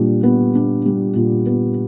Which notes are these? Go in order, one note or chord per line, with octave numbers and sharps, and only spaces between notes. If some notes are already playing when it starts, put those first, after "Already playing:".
Already playing: A#2 G3 D4
B3
D4
G3
A#2
B3